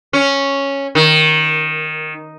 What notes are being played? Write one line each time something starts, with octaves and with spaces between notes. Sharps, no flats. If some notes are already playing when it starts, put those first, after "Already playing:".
C#4
D#3